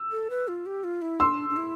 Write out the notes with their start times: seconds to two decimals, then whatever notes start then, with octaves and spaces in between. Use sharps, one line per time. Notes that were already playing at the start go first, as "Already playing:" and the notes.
Already playing: E6
0.12 A4
0.30 B4
0.48 F4
0.66 G4
0.84 F4
1.02 E4
1.20 D4 C6 E6
1.50 D4
1.57 E4